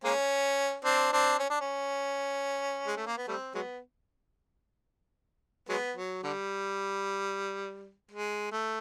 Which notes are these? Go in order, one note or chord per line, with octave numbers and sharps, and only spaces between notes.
G#3 A#3 C#4
C4 D4
C4 D4
C#4
D4
C#4
G#3
A3
A#3
B3
G3 A3 C4
F#3 G#3 B3
F#3 G#3 B3
F#3
D3 G3
G#3
A3